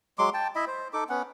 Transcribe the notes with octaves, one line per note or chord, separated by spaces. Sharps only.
F#3 G#3 C6 D6
G5 A5
E4 D#5 E5 B5
C5
D#4 A4 D6
B3 C#4 F#5